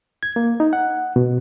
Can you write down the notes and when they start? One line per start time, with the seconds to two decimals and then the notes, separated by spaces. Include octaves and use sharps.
0.23 G#6
0.36 A#3
0.60 D#4
0.73 F#5
1.16 B2